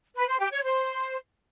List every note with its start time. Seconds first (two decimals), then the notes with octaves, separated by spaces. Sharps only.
0.16 B4
0.28 C5
0.40 G4
0.52 C#5
0.63 C5